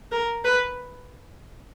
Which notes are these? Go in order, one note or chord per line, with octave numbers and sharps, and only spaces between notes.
A#4
B4